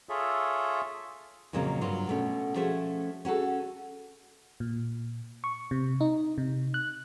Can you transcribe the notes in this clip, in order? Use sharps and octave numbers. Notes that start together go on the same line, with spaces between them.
F4 G#4 A4 C#5 E5
F2 A#2 C#3 F#3 A#3 C#4
G2 F#3 A#3 F4
B2 A3 C#4
F3 A3 C#4 F#4 G#4 E5
C#4 F#4 G#4 A4
A#2
C#6
C3
D#4
C3
F#6